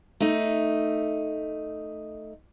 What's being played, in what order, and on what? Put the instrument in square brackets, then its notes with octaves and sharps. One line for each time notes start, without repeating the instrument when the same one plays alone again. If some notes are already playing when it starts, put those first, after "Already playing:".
[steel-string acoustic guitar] A3 D#4